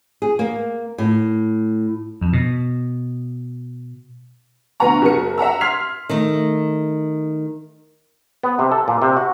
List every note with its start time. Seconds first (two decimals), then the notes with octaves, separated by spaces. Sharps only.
0.22 G#4
0.39 A#3
0.98 A2
2.21 F2
2.33 B2
4.80 D2 B3 B4 F#5 A#5 C#6
5.02 F#1 F#4 A#4 C#7
5.38 E5 F#5 A#5 E6
5.61 C6 F6 G#6 B6 C7 F7
6.09 D#3 A3
8.43 B3
8.59 C3
8.72 A4
8.88 A#2
9.02 C3
9.17 F#4